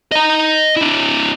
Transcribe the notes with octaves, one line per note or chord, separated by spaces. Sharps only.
D#5 A#5
D4 E4